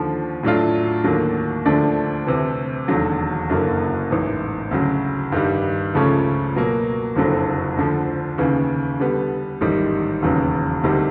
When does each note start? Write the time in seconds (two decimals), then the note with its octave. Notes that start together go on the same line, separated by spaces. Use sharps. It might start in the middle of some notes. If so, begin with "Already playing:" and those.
Already playing: D#2 D3 F3
0.43 A2 F#3 A3 D4 F4
1.04 D#2 D3 F#3 A#3
1.65 D2 D3 F3 A3 D4
2.27 D2 C3 E3
2.88 E1 D#2 D3 F#3
3.49 F#1 F#2 D3 F#3 A#3
4.11 A1 G#2 E3
4.71 D2 C#3 F#3
5.32 G2 D#3 G3
5.94 C#2 C#3 F3 A3 C#4
6.55 B2 F#3 A#3
7.16 F#1 F2 D3 F#3
7.77 D2 D3 F3
8.38 D#2 C#3 E3
9.00 D3 G3 B3
9.61 A1 G#2 D#3 G3
10.22 E1 D#2 C#3 F#3 B3
10.83 D2 C3 D#3 G3